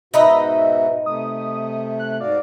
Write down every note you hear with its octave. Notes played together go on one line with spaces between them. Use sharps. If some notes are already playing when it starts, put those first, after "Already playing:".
G#2 B2 D#4 F#4 B4 D#5 E5
C3 A3 D#6
F#6
G#2 F#4 D5 F5